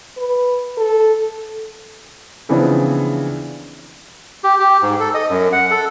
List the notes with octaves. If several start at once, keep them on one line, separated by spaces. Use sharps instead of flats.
B4
A4
C#3 E3 F3 B3 C4 D4
G4
G4
G#2
A4
D#5
F#2
F#5
A4